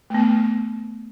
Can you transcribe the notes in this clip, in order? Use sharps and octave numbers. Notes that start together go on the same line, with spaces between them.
A3
B3